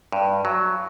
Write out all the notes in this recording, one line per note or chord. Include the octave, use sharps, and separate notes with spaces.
G2
F#3